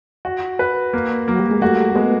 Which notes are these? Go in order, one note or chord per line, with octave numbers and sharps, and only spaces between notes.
F#4
B4
A#3
F#3 A#3
G3
G#3
G3 A3 F#4
G#3 A3 B3